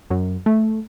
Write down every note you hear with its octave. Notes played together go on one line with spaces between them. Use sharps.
F#2
A3